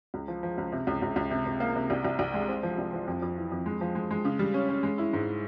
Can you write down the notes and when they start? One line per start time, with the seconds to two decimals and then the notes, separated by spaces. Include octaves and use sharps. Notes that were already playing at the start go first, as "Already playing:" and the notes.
0.14 C#2
0.28 F3
0.43 F3
0.58 C#2
0.72 C3
0.87 C#2
1.02 C#2
1.16 C#2
1.31 C3
1.46 C3
1.60 A#3
1.76 C3
1.90 C2
2.04 C2
2.19 C2
2.34 G#3
2.49 C4
2.63 F3
2.78 C2
2.93 F3
3.08 F2
3.22 F2
3.36 E3
3.52 F2
3.66 G#3
3.81 F3
3.95 G#3
4.11 G#3
4.25 C#3
4.39 G3
4.54 C#4
4.69 C#4
4.83 G#3
4.98 E4
5.13 G#2